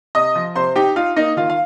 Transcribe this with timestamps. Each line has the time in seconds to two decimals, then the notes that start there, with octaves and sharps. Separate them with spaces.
0.15 C3 D#5 D#6
0.35 F3
0.56 C3 C5 C6
0.76 D#4 G4 G5
0.96 D#4 F4 F5
1.16 A#3 D#4 D#5
1.37 D#3 F4 F5
1.50 F5